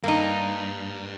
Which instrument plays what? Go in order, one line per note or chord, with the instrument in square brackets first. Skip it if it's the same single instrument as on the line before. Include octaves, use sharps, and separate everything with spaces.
[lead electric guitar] G2 [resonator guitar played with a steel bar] A#3 D#4